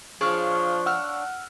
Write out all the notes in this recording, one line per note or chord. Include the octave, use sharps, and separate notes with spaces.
F3 D4 G#4 C#5 F5 F6
F#5 E6 F6